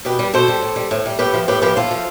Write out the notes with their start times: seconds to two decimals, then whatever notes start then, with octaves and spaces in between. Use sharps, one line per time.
0.05 B2 G4 B4
0.19 G3
0.33 B2 A4 C5
0.48 G3
0.62 A2
0.76 G3
0.91 A2
1.06 G3
1.19 A2 G4 B4
1.34 F3
1.48 A2 G4 B4
1.62 F3 G4 B4
1.76 A2 F4 A4
1.91 F3